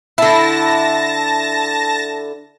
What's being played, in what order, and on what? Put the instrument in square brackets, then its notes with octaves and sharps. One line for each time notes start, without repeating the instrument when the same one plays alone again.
[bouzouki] D3 E4 [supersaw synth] A5 A#6